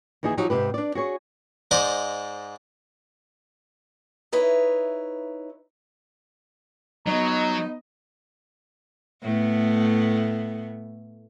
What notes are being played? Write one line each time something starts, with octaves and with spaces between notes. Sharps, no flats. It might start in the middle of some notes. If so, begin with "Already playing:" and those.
D#2 E3 D#4 E4 G#4
F3 F#3 D#4 F#4 G4
G#2 C3 G4 B4
D4 D5
F#4 G#4 C#5
G#2 C5 D5 D#5
D#4 E4 B4 C#5
F#3 B3 D#4 D#5 A#5
A2 A3 B3